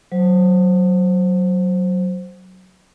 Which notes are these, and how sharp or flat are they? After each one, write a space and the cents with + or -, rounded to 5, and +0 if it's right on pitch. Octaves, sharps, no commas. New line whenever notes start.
F#3 +0 C5 +0